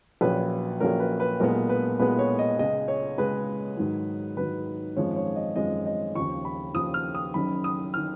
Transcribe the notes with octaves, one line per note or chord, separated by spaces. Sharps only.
A#1 A#2 F#3 C#4 B4
A#1 A#2 F#3 C#4 A#4
B4
B4
B1 A#2 G#3 B3 A#4
B4
B1 A#2 G#3 B3 B4
C#5
D#5
C#2 C#3 G#3 D#5
C#5
C#2 C#3 G#3 B4
G#2 D#3 F#3
G#2 D#3 F#3 B4
G#1 F#2 F3 G#3 C#4 C#5
C#5
D#5
G#1 F#2 F3 G#3 C#4 D#5
D#5
D#2 C#3 F3 C#6
B5
D#2 C#3 F3 D#6
F6
D#6
F#1 F#2 D#3 B5
D#6
D#3 F6